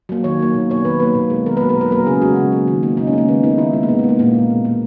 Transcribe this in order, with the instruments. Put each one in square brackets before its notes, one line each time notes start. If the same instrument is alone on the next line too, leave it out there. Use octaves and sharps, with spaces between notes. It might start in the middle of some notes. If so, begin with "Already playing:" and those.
[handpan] F#3 A#3
D#3 C#5
F#3 A#3
B2
A#3 C#5
D#3 B4
F#3 A#3 B4
B2
G#3
D#3 A#4
F#3 A#3 B4
A#4
B2 B4
F#3 A#3 A#4
C#3 G#4
G#3 F#4
C#3
F#3 A#3
D#3
A#3
C#3 D#4
C#4
G#3 A#3
D#3 B3
A#3 D#4
D#3 E4
G#3
A#3
B2 B3
G#3 B3
A#3
A#2 A#3
G#3
B2
A#3